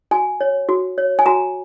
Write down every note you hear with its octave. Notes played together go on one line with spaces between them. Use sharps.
F#4 G#5
C#5
F#4
C#5
G#5
F#4 A#5